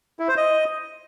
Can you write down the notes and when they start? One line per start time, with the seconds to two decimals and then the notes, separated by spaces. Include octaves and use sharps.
0.19 E4
0.28 C5
0.37 D#5